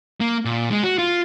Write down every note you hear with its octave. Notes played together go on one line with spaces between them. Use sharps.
A#3
A#2
G#3
F#4
F4